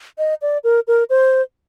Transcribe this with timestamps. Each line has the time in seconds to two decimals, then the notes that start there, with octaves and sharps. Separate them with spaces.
0.18 D#5
0.42 D5
0.64 A#4
0.88 A#4
1.10 C5